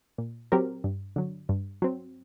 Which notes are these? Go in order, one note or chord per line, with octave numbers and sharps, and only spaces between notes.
A#2
F#3 C4 G4 A#4
G2
D3 F#3
G2
F#3 C4